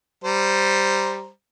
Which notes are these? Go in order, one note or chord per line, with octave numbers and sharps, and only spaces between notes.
G3 C5 A#5